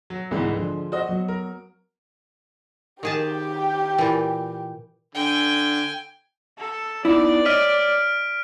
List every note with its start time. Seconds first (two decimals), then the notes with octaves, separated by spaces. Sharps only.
0.10 F#3
0.31 C2 G#2 D3 E3 B3
0.56 D3 F3 G#3
0.92 F#4 C5 D#5
1.09 F#3 B3
1.28 A#4
3.03 D#3 G4 G#4 G5 A5
3.98 A#2 E3
5.15 D3 G5 G#5
6.58 A4
7.05 B3 D#4 E4 D5
7.45 C#5 D#5 F6 B6 D7